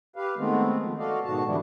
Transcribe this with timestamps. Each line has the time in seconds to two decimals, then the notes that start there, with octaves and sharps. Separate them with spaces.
0.16 G4 B4 F5
0.37 D#3 G#3 A3 B3 C4
0.81 F3
0.98 F#4 A4 D5 D#5 F5
1.25 G#2 B2 D#3 F#4 A5
1.47 D3 E3 G3 D4 E4